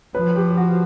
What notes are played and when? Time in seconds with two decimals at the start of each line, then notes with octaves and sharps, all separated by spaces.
0.14 F3 B4
0.36 G4
0.57 F#4